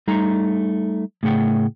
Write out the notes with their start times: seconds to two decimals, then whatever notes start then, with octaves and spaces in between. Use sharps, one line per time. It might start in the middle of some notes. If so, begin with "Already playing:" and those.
0.08 G3 A3 D#4 A#5
1.23 A2 C#3 A3 G#4 F#5 G5